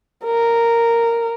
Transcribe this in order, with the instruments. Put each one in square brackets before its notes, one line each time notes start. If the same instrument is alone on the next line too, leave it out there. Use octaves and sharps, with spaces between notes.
[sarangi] A#4